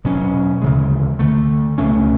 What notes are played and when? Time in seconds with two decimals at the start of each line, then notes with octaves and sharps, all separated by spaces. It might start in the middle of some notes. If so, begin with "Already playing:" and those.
0.04 E2 B2 F#3 C#4
0.62 D2 C#3 E3 G#3
1.19 D2 D3 A3
1.78 C#2 B2 A3 C#4